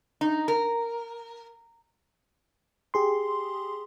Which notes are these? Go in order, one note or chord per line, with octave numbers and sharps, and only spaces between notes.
D#4
A#4
G4 G#4 C6